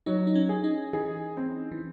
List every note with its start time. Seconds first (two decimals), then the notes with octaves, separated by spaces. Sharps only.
0.06 F#3 D#4
0.27 D#4
0.35 C#4
0.49 G#4
0.64 D#4
0.93 E3 G#4
1.37 C4
1.72 E3